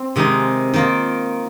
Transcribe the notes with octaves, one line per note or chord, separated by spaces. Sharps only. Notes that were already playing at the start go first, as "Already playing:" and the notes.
Already playing: C4
C3 D#3 G#3 D#4
D#3 A#3 F4